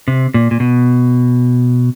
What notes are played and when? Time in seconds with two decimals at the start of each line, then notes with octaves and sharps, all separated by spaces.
0.08 C3
0.34 A#2
0.51 A#2
0.60 B2